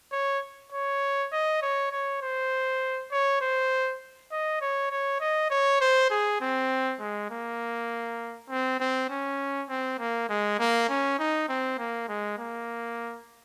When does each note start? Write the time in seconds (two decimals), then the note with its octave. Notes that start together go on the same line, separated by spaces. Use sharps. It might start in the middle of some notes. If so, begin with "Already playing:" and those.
0.12 C#5
0.72 C#5
1.32 D#5
1.62 C#5
1.91 C#5
2.21 C5
3.12 C#5
3.41 C5
4.31 D#5
4.61 C#5
4.91 C#5
5.20 D#5
5.50 C#5
5.81 C5
6.10 G#4
6.41 C4
7.00 G#3
7.30 A#3
8.49 C4
8.80 C4
9.10 C#4
9.69 C4
9.99 A#3
10.29 G#3
10.59 A#3
10.89 C#4
11.19 D#4
11.49 C4
11.78 A#3
12.08 G#3
12.38 A#3